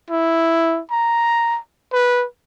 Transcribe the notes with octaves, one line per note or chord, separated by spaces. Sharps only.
E4
A#5
B4